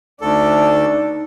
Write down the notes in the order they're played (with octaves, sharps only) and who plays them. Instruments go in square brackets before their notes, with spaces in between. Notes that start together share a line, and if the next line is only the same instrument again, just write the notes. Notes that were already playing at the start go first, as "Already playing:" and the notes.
[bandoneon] D2 A4 [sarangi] D4 [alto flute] D#4